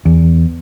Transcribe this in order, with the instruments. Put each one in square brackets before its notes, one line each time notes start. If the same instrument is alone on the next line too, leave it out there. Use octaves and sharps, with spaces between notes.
[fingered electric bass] E2